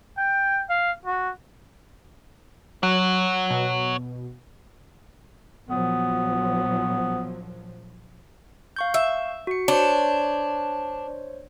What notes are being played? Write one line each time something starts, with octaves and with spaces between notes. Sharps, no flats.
G5
F5
F#4
F#3 C#5 F#5
B2
A#1 F3 F#3 B3
F5 C#6 G6
E5
F#4 C#7
D4 C5 C#5